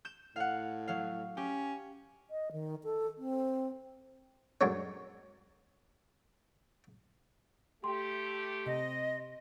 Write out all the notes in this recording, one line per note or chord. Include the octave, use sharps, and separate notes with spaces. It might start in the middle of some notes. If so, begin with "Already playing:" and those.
G6 E7
A2 F5 F#5
F#3 F5
C#4 G4
D#5
D#3
A4
C4
F#2 D3 G#3 C#4
A3 G4 C6
C3 D#5